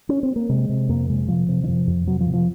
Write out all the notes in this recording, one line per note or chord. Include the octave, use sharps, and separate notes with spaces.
C#4
C4
A#3
C3 G#3
C3
F2 A#3
C3 G#3
C3 F3
C3
D#3
F2 F3
F2
C3 F#3
F3
C3
F3